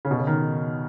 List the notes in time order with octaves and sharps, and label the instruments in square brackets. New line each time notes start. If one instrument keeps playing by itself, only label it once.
[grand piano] C#3
B2
C#3
D#3